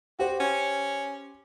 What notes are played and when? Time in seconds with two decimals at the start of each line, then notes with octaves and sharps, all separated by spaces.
0.19 F#4 G4 C5
0.40 C#4